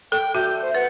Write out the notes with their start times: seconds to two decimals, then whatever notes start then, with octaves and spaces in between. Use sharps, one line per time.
0.12 A4 G5
0.35 D3 A3 F#4 G6
0.49 G6
0.62 C5
0.74 B4 F#5